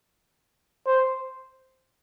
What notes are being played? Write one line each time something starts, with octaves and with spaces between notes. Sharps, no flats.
C5